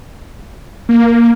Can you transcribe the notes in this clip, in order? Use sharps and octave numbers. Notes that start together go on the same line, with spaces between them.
A#3